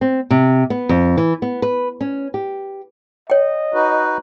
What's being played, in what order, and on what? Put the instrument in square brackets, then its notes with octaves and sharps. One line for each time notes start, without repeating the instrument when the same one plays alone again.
[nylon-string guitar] C4
C3
B3
F2
E3
B3
B4
C#4
G4
[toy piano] C#5 G5 [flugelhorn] D#5
[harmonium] D#4 F#4 B4